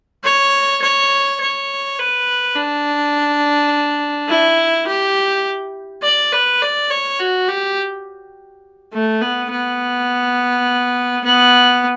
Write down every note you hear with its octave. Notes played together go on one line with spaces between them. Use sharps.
C#5
C#5
C#5
B4
D4
E4
G4
D5
B4
D5
C#5
F#4
G4
A3
B3
B3
B3